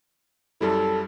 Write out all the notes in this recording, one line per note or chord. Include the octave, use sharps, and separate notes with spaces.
F#2 G3 E4 A4